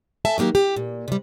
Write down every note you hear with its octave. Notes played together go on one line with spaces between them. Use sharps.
A4 E5 G#5 A5
D#3 F#3 A#3 G4 A#4
G4
A#2
C3 G3